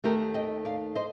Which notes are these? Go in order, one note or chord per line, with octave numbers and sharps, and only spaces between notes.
D#2 D#3 A3 G4 A#4
D#5 G5
D5 F5
C5 D#5